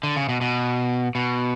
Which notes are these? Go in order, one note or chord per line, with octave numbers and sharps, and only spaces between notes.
D3
C#3
B2
B2
B2